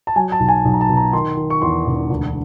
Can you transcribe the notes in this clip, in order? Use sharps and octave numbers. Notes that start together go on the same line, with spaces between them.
A5
F#3 G#5
A5
B1
G#5
B1
A#5
A5
B2
A#5
D#3 C6
D#3
C#6
E2 C6
E1
D2